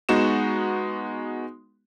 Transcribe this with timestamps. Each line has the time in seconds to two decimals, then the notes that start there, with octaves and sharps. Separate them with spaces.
0.09 G#3 B3 D#4 F#4 E7